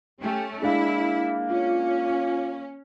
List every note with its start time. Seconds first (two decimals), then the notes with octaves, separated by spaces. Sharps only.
0.20 A3 C#4 G4
0.62 G#3 A#3 D4 E4 F5
1.50 C#4 F4